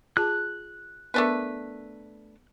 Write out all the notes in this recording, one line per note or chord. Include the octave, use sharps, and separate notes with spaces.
F4 G#4 A5 F#6
A3 B3 D4 A#4 B4